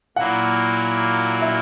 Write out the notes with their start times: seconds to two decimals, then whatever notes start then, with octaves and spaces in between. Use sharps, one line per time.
0.16 A#2 F#3 A#3 E4 F#5
1.42 E5